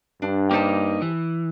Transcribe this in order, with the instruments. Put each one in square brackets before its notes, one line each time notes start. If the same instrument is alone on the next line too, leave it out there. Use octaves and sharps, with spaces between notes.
[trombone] G2 [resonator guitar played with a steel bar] D4
[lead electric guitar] A#3 D#4 [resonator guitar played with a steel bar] G4 C5 A5
[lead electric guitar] E3